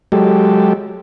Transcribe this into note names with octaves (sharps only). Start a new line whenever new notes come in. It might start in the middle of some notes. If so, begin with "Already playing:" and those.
F#3 G#3 G4 A4